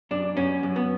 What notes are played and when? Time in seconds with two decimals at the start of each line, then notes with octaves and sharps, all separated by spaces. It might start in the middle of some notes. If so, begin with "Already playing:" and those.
0.11 F#2 D4
0.37 F#2 C#4
0.63 F#2
0.76 B3